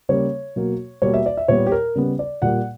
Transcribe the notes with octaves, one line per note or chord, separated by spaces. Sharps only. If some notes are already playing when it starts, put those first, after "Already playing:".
C#3 G3 A#3 C#5
B2 F#3 A#3
B2 G3 A#3 C#5
E5
D5
E5
A#2 G3 B3 C#5
G4
A#4
C#3 G3 B3
D5
A#2 G3 A#3 F#5